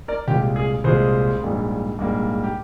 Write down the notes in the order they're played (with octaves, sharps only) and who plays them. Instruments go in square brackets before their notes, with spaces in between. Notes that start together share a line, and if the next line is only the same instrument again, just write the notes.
[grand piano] A#4 D5
C2 A#2 G#3 G4
G#4
C2 A#2 G#3 G#4 C5
A#1 G#2 G3 A#3
A#1 G#2 G3 A#3
G4